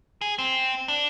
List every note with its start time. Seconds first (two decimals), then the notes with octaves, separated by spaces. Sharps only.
0.21 G#4
0.39 C4
0.88 D4